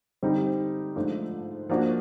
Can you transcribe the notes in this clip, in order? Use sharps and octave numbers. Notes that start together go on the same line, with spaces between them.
D3 G3 C4 D#4
G#2 F3 A3 D4 F4
F3 A#3 D4 F#4